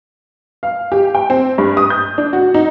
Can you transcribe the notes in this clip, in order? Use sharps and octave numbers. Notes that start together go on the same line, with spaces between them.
F5
G4
G5
C4
G2
D#6
G6
D4
F#4
D#4